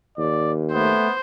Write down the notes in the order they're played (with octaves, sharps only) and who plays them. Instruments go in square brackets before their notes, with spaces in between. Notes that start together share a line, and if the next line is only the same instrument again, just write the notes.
[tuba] D#2 [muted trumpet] D5
[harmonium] A3 [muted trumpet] B3 [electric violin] C5